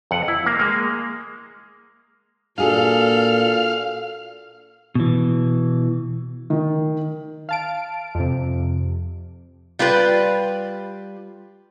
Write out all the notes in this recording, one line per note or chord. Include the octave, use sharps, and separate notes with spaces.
F2 F#5
E4
A#3
G#3 A#3
A#2 D4 F#4 G#4 A4 F5
B2 E3
D#3
F5 A5 D7
F2 C3
G3 F4 G4 B4